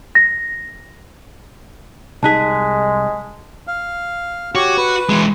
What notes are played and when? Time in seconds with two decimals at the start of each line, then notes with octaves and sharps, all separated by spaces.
0.15 A#6
2.23 C2 G#3 D#4 G#4 A5 F#6 B6
3.67 F5
4.55 F#4 G4 C#5
4.77 B4
5.09 E3 G#3